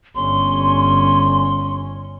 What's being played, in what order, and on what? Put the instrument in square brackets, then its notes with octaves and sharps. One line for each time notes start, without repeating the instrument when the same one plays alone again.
[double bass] G1 C#4 [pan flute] C6